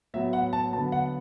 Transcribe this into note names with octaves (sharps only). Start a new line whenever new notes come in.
A2 F#3 B3 E5
F#5
A5
D3 F#3 B3 A5
F#5